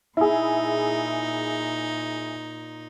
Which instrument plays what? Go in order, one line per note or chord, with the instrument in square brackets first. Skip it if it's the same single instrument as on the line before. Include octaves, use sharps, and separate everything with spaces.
[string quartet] A#2 D#4 [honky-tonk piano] E4 G#4